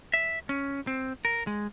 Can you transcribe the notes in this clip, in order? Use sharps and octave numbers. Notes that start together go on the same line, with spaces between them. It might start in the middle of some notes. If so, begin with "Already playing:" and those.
E5
C#4
C4
A#4
G#3